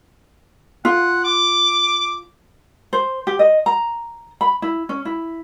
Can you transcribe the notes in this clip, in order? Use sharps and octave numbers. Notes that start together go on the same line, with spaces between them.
F4 F#5
D6
C5
G4
D#5
A#5
B5
E4
C#4
E4